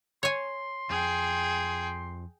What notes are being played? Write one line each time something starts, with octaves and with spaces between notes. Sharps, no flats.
C#5 G#5 C6
F2 G#4 G5